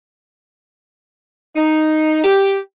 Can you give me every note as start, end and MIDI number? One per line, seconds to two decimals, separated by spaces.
1.56 2.23 63
2.24 2.57 67